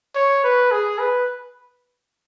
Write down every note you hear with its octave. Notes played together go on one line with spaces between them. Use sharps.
C#5
B4
G#4
B4